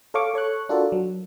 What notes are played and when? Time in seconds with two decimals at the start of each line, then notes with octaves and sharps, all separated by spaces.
0.14 A4 C#5 F5 C#6 D6
0.34 A4 C#5 C#6 F#6
0.69 D4 F4 F#4 A4 A#4 D5
0.92 F#3